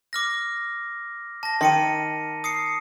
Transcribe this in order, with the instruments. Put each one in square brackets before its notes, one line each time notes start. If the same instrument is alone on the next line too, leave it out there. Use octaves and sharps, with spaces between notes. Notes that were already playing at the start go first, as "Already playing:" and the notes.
[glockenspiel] D6 F6 A#6
A5 A#6
[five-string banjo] D#3 [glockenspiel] C6 C#7 D#7
[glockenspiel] D#6 C7 C#7